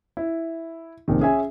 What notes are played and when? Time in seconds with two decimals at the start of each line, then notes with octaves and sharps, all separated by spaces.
0.17 E4
1.08 A#1 C3 D#3
1.20 C#4 G#4 E5 G#5